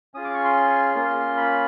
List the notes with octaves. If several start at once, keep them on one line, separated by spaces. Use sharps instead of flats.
C#4 F4 G#4 D#6
D6
C#6
C6
A#3 C#4 F4
B5